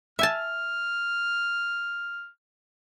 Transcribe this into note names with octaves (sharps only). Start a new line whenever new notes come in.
E5 G#5 A5 F6